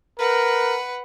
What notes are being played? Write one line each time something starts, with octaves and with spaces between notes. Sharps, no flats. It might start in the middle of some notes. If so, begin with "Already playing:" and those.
A#4 B4 F#5